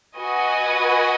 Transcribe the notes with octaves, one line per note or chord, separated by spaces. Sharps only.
F#4 B4 D#5 G#5